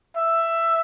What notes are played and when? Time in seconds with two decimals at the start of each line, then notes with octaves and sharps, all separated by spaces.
0.16 E5